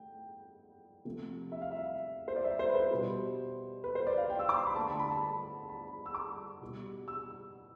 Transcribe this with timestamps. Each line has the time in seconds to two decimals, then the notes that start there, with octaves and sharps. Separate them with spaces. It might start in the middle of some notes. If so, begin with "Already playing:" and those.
Already playing: A3 G5
1.05 C3 F3 A3
1.52 E5
1.62 F5
1.71 E5
2.28 C5
2.36 D5
2.44 E5
2.59 C5
2.69 B4
2.75 C5
2.91 B2 G3
3.84 B4
3.95 C5
4.07 D5
4.18 F5
4.30 G5
4.39 E6
4.49 D6
4.57 C6
4.67 B5
4.76 D3 A3 A5
4.88 A5
4.99 B5
5.11 A5
5.69 B5
6.06 E6
6.15 D6
6.61 B2 G3
7.08 E6